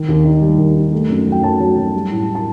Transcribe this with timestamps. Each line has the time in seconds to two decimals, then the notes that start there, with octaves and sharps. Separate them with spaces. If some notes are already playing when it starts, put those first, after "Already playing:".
Already playing: D#3
0.08 D#2
0.24 D#4
0.42 G3
0.58 D#2
0.75 D#4
0.92 A3
1.09 F#2
1.27 F#3
1.32 G5
1.43 F#3 A5
1.60 F#3
1.77 F#3
1.94 G3
2.11 A2
2.27 A2
2.35 A5